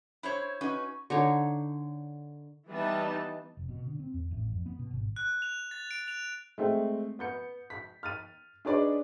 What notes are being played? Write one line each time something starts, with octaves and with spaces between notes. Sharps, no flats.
E4 C5 C#5
C#4 D#4 F#4 B4
D3 D#4 C#5
E3 G3 B3 D#4 A5
F1
B2
D3
C4
E2
A1
F2
B3
B2
G#1
F#6
F7
A6
D7
F7
G#3 A3 C4
B3 G6 C#7
B6
F6 A6 D#7
D4 D#4 G#4 B4 C#5 D5